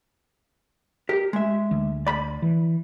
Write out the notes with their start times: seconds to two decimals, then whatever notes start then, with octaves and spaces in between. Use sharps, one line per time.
1.09 G4 A#4
1.33 G#3 E5
1.71 D2
2.07 D5 B5
2.42 E3